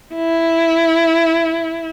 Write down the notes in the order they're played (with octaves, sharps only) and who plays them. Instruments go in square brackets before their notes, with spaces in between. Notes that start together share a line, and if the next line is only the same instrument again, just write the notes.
[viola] E4